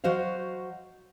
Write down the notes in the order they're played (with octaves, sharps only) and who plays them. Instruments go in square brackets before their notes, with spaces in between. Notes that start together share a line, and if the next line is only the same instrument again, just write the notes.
[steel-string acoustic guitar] F#3 F#4 C5 D#5 F5